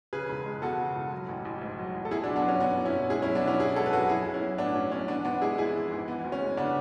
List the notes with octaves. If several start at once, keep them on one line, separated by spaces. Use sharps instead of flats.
C#3 G#4 B4
E1
G#3
E2 F#4 A4
C#3
E1
F#3
A1
A1
G#2
F#3
A1
A4
B2 E4 G#4
D4 F#4
F#1
B3 D4
F#3 C#4
E2 B3 D4
B2
C#4 E4
F#1
G#3 E4 G#4
C#4 E4
B1
B3 D4
B1 C#4 E4
B2 E4 G#4
G#3 F#4 A4
B4
B1 F#4 A4
F#3 E4 G#4
B1
C#4 E4
B1
A2 B3 D4
F#3 C#4
B1 C#4
E3 B3 D4
G#1 B3 D4
G#3 E4 G#4
G#2 E4 G#4
E3
G#1
E3 B3
D2
C#4
G#3
C#3 B3 D4